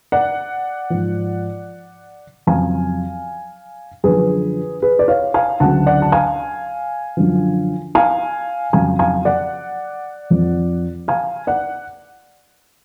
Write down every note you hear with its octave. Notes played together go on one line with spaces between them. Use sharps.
D5 F#5
G#2 F3
F2 C#3 F#3 F5 G#5
F#2 D3 F3 G#4 B4
G#4 B4
D5
C#5 F5
F5 G#5
D2 C#3 F#3 F#5 A5
D5 F#5
A5
F5 G#5
F#2 D3 F3
F5 G#5
F2 C#3 F#3 F5 G#5
F5 G#5
D5 F#5
F2 F3
F5 G#5
D5 F#5